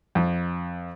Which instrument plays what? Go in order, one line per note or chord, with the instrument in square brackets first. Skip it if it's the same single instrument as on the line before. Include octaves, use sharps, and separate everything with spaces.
[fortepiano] F2